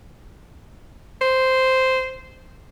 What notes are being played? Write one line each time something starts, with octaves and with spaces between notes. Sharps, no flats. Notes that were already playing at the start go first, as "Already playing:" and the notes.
C5